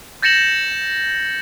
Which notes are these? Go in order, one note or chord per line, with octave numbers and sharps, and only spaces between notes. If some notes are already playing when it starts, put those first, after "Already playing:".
G6 A6 A#6 C#7 E7 F#7